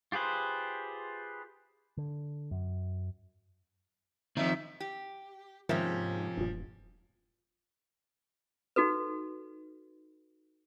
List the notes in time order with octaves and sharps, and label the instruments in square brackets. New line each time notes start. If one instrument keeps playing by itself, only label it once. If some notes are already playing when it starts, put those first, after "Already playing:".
[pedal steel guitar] F4 G4 G#4 B4 C5
[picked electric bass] D3
F#2
[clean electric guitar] D#3 F3 [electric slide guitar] C4 D#4 [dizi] E5
[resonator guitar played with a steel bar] G4
[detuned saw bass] G#2 [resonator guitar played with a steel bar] C3 A#3 C#4 [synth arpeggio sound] D#3 E5 A#5 [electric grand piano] F3
[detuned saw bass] E1 [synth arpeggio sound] G2 A#2
[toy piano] D#4 F#4 A4 B4